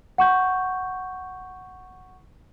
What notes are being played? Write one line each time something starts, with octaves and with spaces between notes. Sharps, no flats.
F#5 C#6 G6